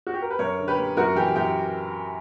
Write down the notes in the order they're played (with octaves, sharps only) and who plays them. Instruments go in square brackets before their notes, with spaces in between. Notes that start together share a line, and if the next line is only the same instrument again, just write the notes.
[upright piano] F#4
G4
A#4
B4
F#2 A#4 C#5
D3
G4 B4
A#3
F#2 F#4 A#4
E3 G4
F#2 G4